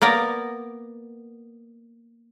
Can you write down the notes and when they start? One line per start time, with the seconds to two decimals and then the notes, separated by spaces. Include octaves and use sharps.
0.02 A#3 B3 A#4 D5